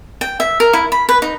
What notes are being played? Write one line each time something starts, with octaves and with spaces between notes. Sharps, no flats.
G5
E5
A#4
E4
B5
B4
D#4